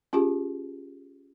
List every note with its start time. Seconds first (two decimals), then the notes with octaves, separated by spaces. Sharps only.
0.13 C#4 F4 G4 G#4